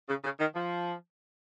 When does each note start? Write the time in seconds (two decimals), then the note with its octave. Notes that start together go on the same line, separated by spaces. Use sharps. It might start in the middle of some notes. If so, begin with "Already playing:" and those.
0.09 C#3
0.24 C#3
0.40 D#3
0.55 F3